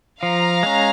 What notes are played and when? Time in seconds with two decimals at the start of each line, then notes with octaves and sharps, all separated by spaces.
0.22 F3 F5 A#5
0.63 G#3 C#4